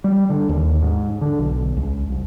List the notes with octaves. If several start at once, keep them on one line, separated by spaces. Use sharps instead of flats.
G3
D3
D#2
G#2
D3
B1
C#2
C2